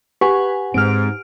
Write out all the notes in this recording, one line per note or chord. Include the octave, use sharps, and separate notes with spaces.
G4 B4 F#5 G#5
G#2 G#3 C4 F6 D7